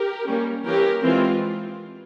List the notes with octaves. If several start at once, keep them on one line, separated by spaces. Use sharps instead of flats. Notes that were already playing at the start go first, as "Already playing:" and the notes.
Already playing: G4 A#4
G3 A#3 C#4
E3 A#3 C#4 G4 A#4
E3 G#3 C4 F4